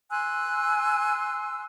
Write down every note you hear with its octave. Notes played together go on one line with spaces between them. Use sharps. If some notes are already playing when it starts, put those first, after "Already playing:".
G#5 C6 E6 F#6